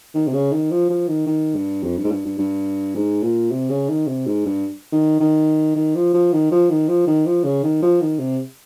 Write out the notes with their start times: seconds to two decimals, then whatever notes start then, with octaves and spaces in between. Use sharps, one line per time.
0.15 D#3
0.27 C3
0.34 C#3
0.52 D#3
0.71 F3
0.90 F3
1.08 D#3
1.26 D#3
1.55 G2
1.84 F2
1.97 G2
2.04 G#2
2.11 G2
2.25 G2
2.39 G2
2.95 G#2
3.23 A#2
3.51 C3
3.70 C#3
3.89 D#3
4.07 C3
4.27 G#2
4.46 G2
4.92 D#3
5.20 D#3
5.76 D#3
5.95 F3
6.14 F3
6.33 D#3
6.52 F3
6.70 D#3
6.88 F3
7.07 D#3
7.26 F3
7.44 C#3
7.63 D#3
7.82 F3
8.01 D#3
8.19 C3